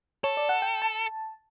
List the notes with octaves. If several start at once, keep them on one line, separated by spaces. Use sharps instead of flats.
A4 C#5
D5
F#5
G5
A5